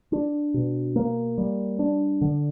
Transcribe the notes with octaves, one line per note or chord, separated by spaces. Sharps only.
D4
B2
A#3
G3
D4
D3